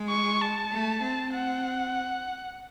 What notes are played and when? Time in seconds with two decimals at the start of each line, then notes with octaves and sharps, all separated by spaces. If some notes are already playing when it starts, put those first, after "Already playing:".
Already playing: G#3
0.10 C#6
0.41 A5
0.72 A3
1.03 C4
1.34 F#5